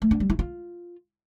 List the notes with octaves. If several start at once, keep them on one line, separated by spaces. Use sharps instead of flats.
A3
D4
G3
E4
F4